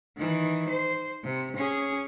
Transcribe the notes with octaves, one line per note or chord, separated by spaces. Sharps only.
D#3 E3
C5
C3
C#4 G#4